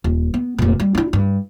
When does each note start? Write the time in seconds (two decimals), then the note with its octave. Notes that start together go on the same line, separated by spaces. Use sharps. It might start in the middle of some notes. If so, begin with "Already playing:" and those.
0.04 D#1
0.34 B3
0.58 F1 A#2
0.80 G3
0.95 D4 E4
1.13 G2